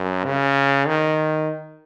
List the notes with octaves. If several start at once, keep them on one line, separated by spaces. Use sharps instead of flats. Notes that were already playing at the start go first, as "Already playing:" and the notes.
Already playing: F#2
C#3
D#3